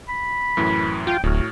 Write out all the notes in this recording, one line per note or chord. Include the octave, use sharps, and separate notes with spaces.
B5
F#2 A2 E3
F4 G5
D1 A2 F#4 F6